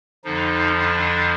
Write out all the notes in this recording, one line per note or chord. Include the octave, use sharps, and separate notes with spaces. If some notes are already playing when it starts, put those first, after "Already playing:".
F2 D3 F3 D#4
D4